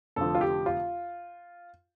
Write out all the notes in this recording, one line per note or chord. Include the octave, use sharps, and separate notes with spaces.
F1 F2 D3 F3 A4
F4
G4
F4